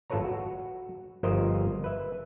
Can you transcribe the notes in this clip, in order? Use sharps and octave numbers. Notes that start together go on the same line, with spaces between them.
G#1 F4 A4 B4 C#5 A#5
F#4
G1 F3 F4 A#4 C5 D#5
B4 E5